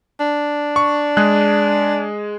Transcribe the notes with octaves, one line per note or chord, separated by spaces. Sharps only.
D4
C#6
G#3 G#4 F#6